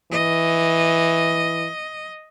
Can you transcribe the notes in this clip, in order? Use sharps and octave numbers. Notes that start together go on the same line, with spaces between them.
E3 D#5